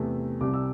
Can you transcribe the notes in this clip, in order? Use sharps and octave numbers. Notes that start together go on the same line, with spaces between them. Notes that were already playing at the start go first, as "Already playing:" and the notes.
Already playing: E2 C3 A3
C2 C3 G3 D6
E6